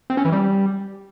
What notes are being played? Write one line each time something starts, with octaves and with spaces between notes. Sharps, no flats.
C4
C#4
E3
G3